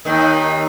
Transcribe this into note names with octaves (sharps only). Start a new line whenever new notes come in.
D#2 D#3